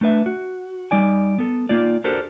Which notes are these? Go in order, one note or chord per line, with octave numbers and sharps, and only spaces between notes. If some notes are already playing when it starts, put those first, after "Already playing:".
A3 D4 B4 E5
F#4
G3 D#4 D5 G#5
B3 A4
A#3 D#4 F4 D5
D4 F#4 G4 A4 A#4 C5